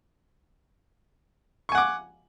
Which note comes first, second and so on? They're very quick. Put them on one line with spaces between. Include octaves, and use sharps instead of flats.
C#6 G#5 F#5 D6